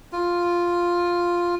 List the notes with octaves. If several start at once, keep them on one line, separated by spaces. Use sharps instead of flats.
F4